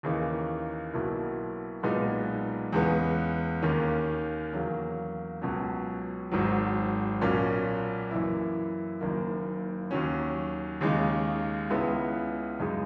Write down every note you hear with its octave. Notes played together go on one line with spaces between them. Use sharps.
D#2 C#3 E3 A#3 D#4
B1 B2 F#3 A#3 E4
B1 A#2 G#3 B3 D#4
E2 C#3 G#3 B3
D#2 D#3 A#3 C#4
E2 C#3 F#3 A#3
C#2 B2 F#3 C#4
G#1 G#2 D#3 F#3
B1 A#2 A#3 C#4
F#2 E3 A#3 E4
F#1 F#2 D#3 A#3
D#2 D#3 F#3 C#4
D#2 C#3 G#3 D#4
C#2 C#3 G#3 B3 E4
F#2 C#3 G#3 D#4